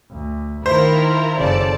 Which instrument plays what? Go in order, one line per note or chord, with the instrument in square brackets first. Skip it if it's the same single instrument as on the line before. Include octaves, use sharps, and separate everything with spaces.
[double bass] D2
[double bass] D#3 [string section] E4 F4 A#4 [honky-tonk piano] C5
[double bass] F#1 C#3 [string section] A4 D5 A5